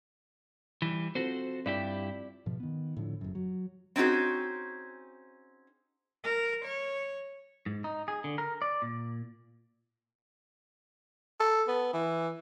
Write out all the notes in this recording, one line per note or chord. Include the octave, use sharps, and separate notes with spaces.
E3 G3
C4 F4 F#4 A4 C5
G2 E4 G4 D5
G#2 B2 F3
D#3 B3
A2 D3 F3
F#1 F#2
F#3
C4 C#4 D#4 F#4 G#4
A#4
C#5
G#2
D#4
G#4
D3
A#4
D5
A#2
A4
B3
E3